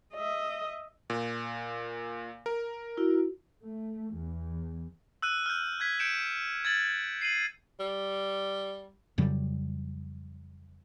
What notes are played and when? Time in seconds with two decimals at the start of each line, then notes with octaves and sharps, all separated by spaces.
0.14 D#5 E5
1.10 A#2
2.46 A#4
2.97 E4 F#4
3.63 A3
4.15 E2
5.22 E6 F#6 D#7
5.46 F6 G6
5.80 F#6 G#6 B6
5.99 G6 C#7 D7 E7
6.65 G#6 A6 F#7
7.21 C7 D#7 F#7
7.80 G3
9.18 F2 C#3 F#3 G3